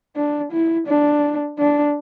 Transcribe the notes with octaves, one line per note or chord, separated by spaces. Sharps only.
D4
E4
D4
D4